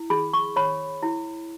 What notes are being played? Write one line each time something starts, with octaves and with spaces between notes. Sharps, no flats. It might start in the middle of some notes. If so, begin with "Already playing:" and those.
Already playing: E4
G#4 B5
C#6
C#5 B5
E4